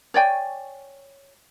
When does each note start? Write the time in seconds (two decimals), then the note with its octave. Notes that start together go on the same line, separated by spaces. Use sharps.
0.14 C#5 D5 G5 G#5